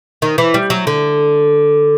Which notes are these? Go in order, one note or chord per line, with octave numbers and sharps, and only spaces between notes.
D#3
E3
G3
F#3
D3